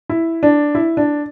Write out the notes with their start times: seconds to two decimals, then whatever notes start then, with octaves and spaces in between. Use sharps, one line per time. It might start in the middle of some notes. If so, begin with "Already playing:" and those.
0.09 E4
0.43 D4
0.75 E4
0.97 D4